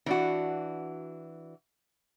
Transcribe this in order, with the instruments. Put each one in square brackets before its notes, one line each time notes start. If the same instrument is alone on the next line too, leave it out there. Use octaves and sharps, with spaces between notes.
[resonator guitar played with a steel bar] E3 D4 F#4